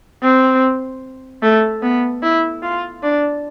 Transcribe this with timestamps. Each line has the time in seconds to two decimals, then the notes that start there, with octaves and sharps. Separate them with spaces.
0.22 C4
1.42 A3
1.82 B3
2.22 E4
2.62 F4
3.03 D4